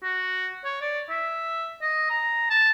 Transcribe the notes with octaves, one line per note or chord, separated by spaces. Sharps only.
F#4
C#5
D5
E5
D#5
A#5
A5